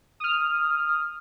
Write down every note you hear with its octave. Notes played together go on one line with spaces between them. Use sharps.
D#6 F6